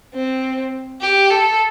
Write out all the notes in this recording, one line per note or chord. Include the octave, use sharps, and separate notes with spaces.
C4
G4
A4